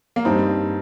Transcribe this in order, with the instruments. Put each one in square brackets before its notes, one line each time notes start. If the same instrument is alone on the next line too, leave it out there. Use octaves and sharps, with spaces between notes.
[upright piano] A#3
[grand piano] G2 G3 D#4 [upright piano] C4